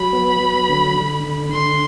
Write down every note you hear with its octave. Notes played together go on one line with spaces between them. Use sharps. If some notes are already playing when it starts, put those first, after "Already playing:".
Already playing: F#3 B5
B3
F#3
D3
D3
D3
D3 C6